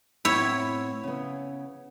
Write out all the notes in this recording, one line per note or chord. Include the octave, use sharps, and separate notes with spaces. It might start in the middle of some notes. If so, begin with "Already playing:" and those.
A2 B3 C4 E4 C#5
C#3 B3